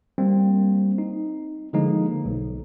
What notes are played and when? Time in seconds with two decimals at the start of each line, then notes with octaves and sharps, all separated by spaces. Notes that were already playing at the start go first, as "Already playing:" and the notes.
0.18 G3 A#3 C4
0.98 D#4
1.73 D3 F3 G#3 A#3 D#4
2.25 B1